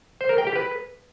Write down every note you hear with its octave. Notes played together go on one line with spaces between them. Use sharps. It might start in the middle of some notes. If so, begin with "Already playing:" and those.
C5
A#4
G5
G4
B4